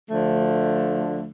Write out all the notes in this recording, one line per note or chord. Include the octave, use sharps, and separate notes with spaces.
D2 D3 F3 A3